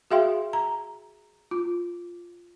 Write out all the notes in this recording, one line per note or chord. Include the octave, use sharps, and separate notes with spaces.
F#4 G#4 E5 F5 G5 C6
A#5
F4